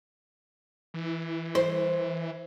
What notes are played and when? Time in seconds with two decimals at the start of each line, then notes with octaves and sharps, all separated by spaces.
0.94 E3
1.55 C5